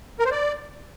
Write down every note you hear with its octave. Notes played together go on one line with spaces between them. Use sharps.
A#4
C5
D5